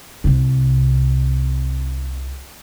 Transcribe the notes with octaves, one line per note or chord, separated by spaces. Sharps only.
C2 C3